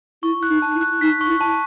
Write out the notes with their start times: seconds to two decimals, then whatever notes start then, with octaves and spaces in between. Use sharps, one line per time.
0.23 E4 C#6
0.43 F#6
0.50 D#4
0.62 A5
0.75 E4
0.81 F#6
1.01 D#4 B6
1.21 C#6
1.28 E4
1.41 A5